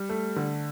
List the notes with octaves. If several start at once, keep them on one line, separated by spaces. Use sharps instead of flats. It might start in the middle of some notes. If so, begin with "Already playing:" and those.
Already playing: G3
A3
D3